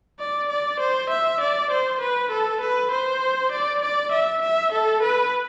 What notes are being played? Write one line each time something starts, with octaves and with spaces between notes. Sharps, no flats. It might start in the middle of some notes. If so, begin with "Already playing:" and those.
D5
D5
C5
E5
D5
C5
B4
A4
B4
C5
D5
D5
E5
E5
A4
B4